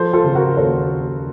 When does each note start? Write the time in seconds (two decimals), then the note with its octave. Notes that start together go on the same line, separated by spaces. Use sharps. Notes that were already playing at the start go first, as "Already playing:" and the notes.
Already playing: F3 A4 C5
0.13 F4 A4
0.24 C#3
0.35 F#4 A#4
0.57 D#2 A4 C5